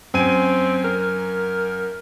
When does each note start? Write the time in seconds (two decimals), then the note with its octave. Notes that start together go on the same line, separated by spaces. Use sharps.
0.14 F#2 C4 G#5 D#7
0.85 A#4